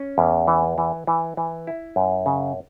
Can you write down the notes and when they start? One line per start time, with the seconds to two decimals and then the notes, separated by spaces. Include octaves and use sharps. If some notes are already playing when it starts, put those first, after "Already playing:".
Already playing: C#4
0.18 E2
0.47 E3
0.78 E3
1.07 E3
1.37 E3
1.67 E4
1.96 F#2
2.26 C#3